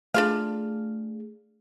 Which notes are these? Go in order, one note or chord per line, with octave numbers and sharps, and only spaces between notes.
A3 D4 F4 G#4 F5